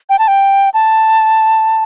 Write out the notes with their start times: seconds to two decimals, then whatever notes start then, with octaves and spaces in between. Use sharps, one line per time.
0.10 G5
0.19 A5
0.28 G5
0.74 A5